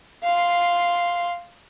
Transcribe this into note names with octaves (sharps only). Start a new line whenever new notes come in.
F5 C6